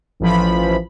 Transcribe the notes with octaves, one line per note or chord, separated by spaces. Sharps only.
A1 E3 F3 B5